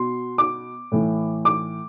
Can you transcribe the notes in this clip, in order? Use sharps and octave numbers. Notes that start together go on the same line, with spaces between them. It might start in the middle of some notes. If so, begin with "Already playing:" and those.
Already playing: B2 C6
D6
A2 E3
D6